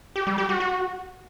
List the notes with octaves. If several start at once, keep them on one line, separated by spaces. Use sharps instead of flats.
G4
G3
G4
F#4
F#4